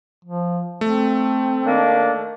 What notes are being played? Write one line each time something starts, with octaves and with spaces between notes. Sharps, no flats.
F3
A3 C4
D#3 A#3 D4